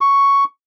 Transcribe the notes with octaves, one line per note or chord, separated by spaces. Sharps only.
C#6